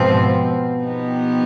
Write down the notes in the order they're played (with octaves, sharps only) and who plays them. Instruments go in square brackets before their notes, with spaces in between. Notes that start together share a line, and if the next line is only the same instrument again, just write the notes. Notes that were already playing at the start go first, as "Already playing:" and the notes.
Already playing: [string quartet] G#2 F3 C4 [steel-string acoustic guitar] B2
[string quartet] F3 B3 D#4 G4